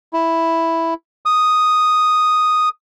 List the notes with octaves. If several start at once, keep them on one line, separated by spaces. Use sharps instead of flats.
E4
D#6